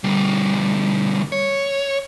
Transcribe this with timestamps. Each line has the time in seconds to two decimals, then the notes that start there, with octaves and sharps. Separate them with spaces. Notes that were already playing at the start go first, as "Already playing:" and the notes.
0.04 D2 G3
1.32 C#5